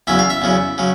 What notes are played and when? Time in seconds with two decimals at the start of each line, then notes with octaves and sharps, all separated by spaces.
0.07 E2 C#3 F#3 E5
0.19 F5
0.30 E5
0.42 E2 C#3 F#3
0.78 C#3 F#3